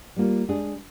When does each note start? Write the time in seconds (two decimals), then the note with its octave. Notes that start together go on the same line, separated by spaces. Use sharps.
0.16 G3 A#3 F4
0.48 G#3 D4 G#4